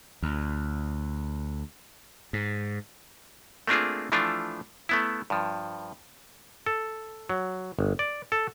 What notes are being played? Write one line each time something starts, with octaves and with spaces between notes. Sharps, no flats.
D2
G#2
A3 A#3 C4 D4 F4 G#4
E3 F3 A3 D4 F4
A3 B3 E4
G2 F3
A4
F#3
G1
D5
A4